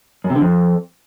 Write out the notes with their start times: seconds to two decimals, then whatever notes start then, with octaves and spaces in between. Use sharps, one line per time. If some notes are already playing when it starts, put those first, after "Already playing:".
0.24 F#2
0.30 C3
0.36 D3
0.41 F2